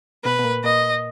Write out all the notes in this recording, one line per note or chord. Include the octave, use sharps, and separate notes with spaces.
B2 B4
B2
A#2
A#2 D#5